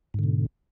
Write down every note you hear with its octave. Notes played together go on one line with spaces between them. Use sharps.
G#2 B2 D3